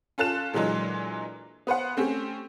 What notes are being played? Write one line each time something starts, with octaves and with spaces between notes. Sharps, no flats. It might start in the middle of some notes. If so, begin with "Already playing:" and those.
C#4 F4 A4 F#6 E7
A#2 D3 E3 F#3 G#3
B3 B4 C5 F#5
A3 C4 C#4 G4